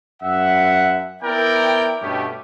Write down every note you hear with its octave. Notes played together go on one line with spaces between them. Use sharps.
F#2 E5 F#5
B3 E4 A#4 D5 G5
G2 B2 A3 B3 C#4 G4